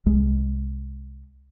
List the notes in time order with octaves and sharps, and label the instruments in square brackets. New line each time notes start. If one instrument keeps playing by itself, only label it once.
[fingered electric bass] C2 G#3